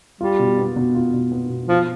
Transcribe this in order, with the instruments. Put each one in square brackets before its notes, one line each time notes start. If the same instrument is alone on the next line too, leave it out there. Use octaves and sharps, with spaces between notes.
[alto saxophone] G3 [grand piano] F4
[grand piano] B2
B3
B2
F4
B2
B3
B2
[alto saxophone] F3 [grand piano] F4